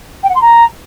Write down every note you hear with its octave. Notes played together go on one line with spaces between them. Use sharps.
G5
F#5
C6
A#5